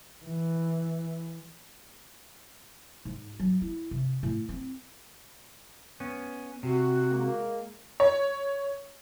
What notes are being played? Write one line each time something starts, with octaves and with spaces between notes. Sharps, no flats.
E3
G#2
F#3
E4
C3
A2
C4
B3 C#4
C3 F#4
G#3 A#3
C#5